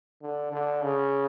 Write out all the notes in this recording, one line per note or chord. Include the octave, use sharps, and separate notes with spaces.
D3
D3
C#3